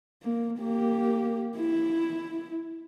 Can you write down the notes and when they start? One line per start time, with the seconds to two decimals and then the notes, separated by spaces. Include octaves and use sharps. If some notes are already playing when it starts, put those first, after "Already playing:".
0.23 A#3
0.59 A#3 G4
1.57 E4